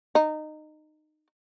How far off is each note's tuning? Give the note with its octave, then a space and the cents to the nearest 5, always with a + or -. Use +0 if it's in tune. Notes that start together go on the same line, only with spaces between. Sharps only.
D#4 -20